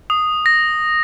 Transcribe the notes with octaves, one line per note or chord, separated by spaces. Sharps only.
D#6
A#6